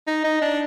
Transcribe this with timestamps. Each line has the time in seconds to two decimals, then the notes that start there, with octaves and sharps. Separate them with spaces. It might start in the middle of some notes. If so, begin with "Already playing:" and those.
0.07 D#4
0.24 D#4
0.42 D4